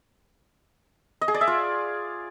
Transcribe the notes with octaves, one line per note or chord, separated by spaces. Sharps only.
D#5
G#4
D5
E5
F4